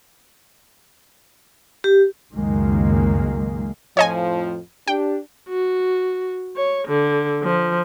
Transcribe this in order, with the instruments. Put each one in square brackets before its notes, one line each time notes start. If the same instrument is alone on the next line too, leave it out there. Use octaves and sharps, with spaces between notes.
[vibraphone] G4
[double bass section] C#2 F#2 D#3 G#3 A#3
[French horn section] F2 A2 F3 [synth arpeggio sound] C#5 D#5 G#5
[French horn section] D4 G4 [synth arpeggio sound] G5
[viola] F#4
C#5
D3
F3